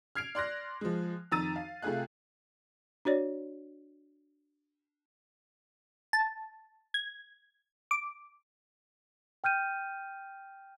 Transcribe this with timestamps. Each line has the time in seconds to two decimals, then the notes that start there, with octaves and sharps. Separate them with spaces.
0.15 F6 G#6 C7 D7 F7
0.35 D5 C6 F#6 A#6
0.81 F3 G#3
1.32 F2 D#3 A#5 E6 A6 D#7
1.56 F5
1.82 C3 A3 F4 G#4 F5 F#6
3.05 D4 F#4 C#5 D5
6.13 A5
6.94 G#6
7.91 D6
9.44 G5 F6 G6 D#7